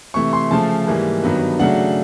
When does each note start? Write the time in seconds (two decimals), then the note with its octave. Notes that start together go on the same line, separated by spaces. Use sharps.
0.14 C3 E3 A3 C#6
0.33 C6
0.51 C#3 F3 A3 A5
0.87 G#2 E3 G3 A#3
1.23 G2 D#3 F#3 B3
1.59 C#3 F#3 A3 D4 F#5